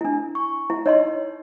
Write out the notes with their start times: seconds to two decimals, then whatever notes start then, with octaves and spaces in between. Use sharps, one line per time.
0.01 D4 E4
0.35 C#6
0.70 E4
0.86 D#4 C#5 D#5 C6